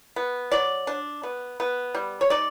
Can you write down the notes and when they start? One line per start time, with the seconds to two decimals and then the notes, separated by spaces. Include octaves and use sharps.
0.16 B3
0.52 F#3 D5
0.87 D4
1.23 B3
1.60 B3
1.95 G3
2.21 C#5
2.30 D#4 D5